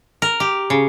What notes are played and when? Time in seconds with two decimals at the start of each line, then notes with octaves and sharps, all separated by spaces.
0.22 A#4
0.40 G4
0.70 C#3